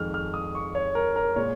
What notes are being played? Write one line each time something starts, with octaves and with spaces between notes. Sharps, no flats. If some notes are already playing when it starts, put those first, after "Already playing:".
Already playing: F2 D#3 G#3 F6
F6
D#6
C#6
C#5
A#4
A#4
A#2 G#3 C#5